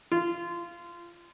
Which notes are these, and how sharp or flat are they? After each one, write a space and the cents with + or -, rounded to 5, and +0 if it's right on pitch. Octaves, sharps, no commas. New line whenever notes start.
F4 -20